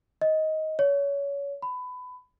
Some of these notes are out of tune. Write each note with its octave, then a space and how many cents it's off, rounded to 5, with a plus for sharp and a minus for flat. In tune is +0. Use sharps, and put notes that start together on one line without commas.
D#5 +15
C#5 +25
B5 +20